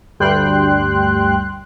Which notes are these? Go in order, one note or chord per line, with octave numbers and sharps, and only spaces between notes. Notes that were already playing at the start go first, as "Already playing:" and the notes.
D2 G2 G3 G5 C6 F#6